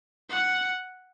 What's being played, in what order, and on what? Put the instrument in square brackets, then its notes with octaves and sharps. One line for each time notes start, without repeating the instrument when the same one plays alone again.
[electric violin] F#5